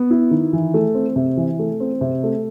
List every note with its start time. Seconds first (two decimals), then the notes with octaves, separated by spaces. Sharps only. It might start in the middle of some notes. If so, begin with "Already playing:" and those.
Already playing: B3
0.10 E4
0.31 D#3
0.53 E3
0.74 A3
0.95 C4
1.16 C3
1.37 E3
1.59 A3
1.80 C4
2.01 C3
2.24 A3